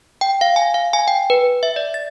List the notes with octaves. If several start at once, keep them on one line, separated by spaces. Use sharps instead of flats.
G5
F5
G#5
F5
G#5
G5
B4
E5
D5
A6